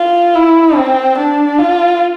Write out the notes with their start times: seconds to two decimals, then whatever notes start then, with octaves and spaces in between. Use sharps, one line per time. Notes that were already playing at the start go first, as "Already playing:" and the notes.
Already playing: F4
0.35 E4
0.76 C4
1.18 D4
1.59 F4